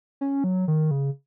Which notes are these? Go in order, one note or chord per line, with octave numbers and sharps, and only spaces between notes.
C#4
F#3
D#3
C#3